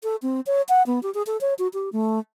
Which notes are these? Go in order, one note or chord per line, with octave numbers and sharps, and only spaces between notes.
A4
C4
C#5
F#5
B3
G4
G#4
A4
C#5
F#4
G4
A3